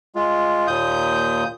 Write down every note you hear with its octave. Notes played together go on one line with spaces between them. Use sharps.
G#3 F4
D#2 A#2 D#6 G6